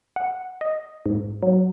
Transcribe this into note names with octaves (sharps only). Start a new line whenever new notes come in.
F#5
D#5
G#2
F#3